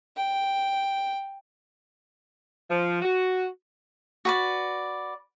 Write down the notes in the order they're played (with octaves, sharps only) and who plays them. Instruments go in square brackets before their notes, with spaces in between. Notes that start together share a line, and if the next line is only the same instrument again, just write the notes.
[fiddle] G5
[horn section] F3
F#4
[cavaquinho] F#4 B4 D5